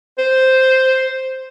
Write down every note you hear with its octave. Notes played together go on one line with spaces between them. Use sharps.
C5